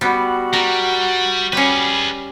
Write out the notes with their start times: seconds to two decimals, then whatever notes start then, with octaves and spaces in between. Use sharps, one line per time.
0.01 G3 B3 F#4
0.53 G3 A#4
1.53 G3 C#4 G#4 B4